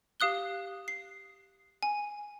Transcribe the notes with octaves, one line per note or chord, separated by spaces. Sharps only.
G4 F5 D#6 F#6 G7
C7
G#5